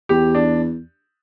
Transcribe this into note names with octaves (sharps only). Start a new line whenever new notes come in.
E2 G4
D4